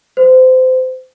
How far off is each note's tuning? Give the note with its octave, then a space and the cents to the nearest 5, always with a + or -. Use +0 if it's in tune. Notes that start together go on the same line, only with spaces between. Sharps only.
C5 -25